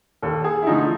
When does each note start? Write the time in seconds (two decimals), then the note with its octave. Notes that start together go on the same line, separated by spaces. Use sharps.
0.22 D#2 A4
0.44 G#4
0.63 E4
0.67 D3 F3 A3 D#4